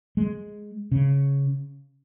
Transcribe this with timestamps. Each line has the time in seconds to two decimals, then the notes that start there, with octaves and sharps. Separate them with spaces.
0.17 G#3
0.92 C#3